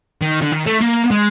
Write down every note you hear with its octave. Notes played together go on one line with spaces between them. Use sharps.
D#3
D3
D#3
A3
A#3
G#3